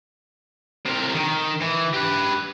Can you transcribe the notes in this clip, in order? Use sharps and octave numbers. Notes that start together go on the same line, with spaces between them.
C3 A#4
D#3
E3
G4 B4